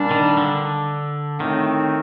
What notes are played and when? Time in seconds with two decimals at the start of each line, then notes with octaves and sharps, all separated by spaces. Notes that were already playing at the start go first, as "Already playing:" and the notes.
Already playing: A#2 G3 D4
0.11 D#3
0.37 D3
1.40 A2 D#3 A3 C4 D#4